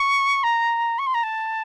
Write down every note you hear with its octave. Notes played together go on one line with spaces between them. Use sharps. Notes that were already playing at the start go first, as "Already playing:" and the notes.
Already playing: C#6
A#5
C#6
C6
A#5
A5